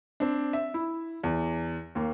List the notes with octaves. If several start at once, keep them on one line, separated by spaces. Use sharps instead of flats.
C4 D4
E5
E4
E2
D#2 A#3